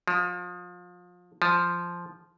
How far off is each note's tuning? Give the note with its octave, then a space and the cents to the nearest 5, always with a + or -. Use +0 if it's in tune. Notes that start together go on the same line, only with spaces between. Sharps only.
F3 +30
F3 -5